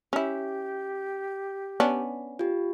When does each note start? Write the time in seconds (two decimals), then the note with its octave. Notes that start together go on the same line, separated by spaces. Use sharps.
0.13 C#4 E4 G4
1.80 B3 C#4 D4
2.39 F4 G4